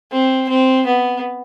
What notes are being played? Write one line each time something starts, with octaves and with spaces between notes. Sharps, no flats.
C4
C4
B3